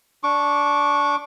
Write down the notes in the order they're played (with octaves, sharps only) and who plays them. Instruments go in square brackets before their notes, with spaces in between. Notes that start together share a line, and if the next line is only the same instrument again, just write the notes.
[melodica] D4 C#6 D6